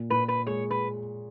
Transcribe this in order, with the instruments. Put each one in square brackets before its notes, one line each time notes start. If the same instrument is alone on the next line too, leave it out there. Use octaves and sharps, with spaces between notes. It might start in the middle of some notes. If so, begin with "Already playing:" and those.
Already playing: [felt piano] A#2
[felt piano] A#2 [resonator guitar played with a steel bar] B4
[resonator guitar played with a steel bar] B4
[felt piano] G#3 [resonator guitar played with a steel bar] C#5
[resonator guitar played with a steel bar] B4